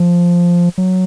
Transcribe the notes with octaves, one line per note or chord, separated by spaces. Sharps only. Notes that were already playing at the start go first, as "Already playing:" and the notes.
Already playing: F3
F#3